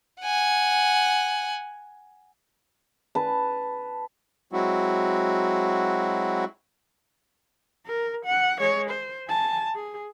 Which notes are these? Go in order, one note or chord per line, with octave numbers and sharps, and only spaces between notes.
F#5 G#5
B4 A5
F#3 G#3 C4 E4 F#4
A#4
F#5
G#3 C#5
C5
G#5 A5
G#4